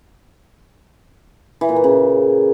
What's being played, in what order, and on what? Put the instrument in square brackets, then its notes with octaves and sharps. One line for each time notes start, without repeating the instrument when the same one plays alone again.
[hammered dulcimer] E3
A#2
A#3
C#3